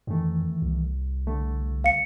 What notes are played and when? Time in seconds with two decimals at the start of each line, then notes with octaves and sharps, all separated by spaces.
0.07 F2 D#3 E3 A3
0.62 C2
1.27 D3 A3
1.84 F5 C#7